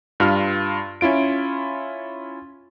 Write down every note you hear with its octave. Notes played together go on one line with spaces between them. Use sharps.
G2 F4 F6
C#4 E4 F4 D7